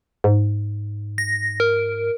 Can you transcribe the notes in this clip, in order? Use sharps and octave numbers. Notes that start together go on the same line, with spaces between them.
G#2
A#6
A#4